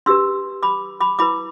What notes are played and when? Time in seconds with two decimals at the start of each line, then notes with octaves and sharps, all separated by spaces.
0.06 D4 G4 B4 C6 E6
0.63 B5 D6
1.00 B5 D6
1.19 E4 B4 B5 D6